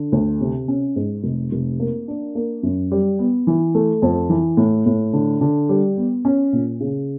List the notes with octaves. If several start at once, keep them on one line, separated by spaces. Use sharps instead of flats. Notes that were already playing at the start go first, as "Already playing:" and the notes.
Already playing: D3
D2
C3
C#4
G#2
F1
F1
A#3
D4
A#3
F#2
G3
B3
E3
A3
F2
E3
A2
A2
D3
D3
G3
B3
C#4
A#2
C#3